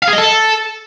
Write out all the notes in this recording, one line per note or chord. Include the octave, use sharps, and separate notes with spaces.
F5
G#4
D#5
A4